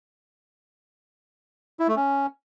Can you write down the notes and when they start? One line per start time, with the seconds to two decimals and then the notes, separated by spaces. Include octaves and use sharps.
1.80 E4
1.88 A3
1.96 C#4